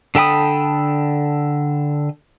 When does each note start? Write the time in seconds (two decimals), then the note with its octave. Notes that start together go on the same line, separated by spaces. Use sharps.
0.15 D3 A4 G5 B5 D#6